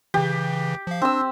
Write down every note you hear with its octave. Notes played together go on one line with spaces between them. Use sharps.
C#3 E3 G4
F3 F5
C4 D4 E6